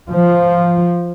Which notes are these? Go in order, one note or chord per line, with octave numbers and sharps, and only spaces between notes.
F3